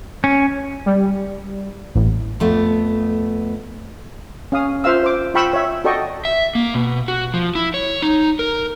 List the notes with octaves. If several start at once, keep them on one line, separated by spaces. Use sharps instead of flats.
C#4
G3
A1
F2 A3 B3
C#4 F5 D#6
F4 C5 E5 F5 E6
C5 D6
F4 F5 G5 B5 C#6 E6
C#5 E5
F#4 A4 D5 D#5 G5 C#6
E5
A#3
B2
F#4
F3
E4
C#5
D#4
A#4